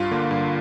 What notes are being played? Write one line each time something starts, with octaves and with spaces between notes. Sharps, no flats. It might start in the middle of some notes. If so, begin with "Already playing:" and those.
Already playing: G2 F4
D3 A#3
G2